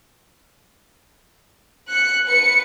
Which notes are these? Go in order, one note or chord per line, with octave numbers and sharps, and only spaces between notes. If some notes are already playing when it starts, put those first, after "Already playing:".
F#6 C#7
B4 C#7